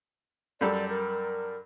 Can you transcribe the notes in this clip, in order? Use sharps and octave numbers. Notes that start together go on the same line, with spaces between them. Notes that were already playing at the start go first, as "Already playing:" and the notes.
F#2 G3 A4 D5
A#4